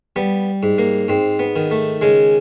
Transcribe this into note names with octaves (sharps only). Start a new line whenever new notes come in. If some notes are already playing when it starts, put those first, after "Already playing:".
G3 B3
G#2
A#3
G#2 C4
B3
D#3
A3
C#3 G#3